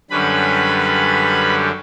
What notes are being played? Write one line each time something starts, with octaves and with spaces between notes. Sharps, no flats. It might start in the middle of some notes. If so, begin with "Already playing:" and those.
F#2 D3 G3 C#4 B4 B5